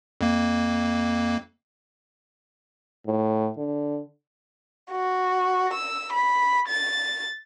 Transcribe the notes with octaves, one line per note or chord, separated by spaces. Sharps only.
F2 A#3
A2
D3
F#4
E6
B5
A6